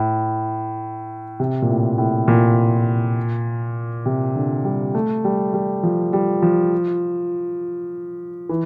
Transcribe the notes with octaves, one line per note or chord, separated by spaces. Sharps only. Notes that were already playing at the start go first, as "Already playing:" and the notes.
Already playing: A2
C3
A#2
A2
A2
A#2
C3
D3
G3
A3
G3
G3
F3
G3
F3
E3